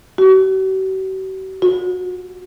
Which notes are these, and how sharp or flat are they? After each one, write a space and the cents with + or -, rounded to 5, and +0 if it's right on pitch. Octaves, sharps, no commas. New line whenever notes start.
F#4 +45
F#4 -30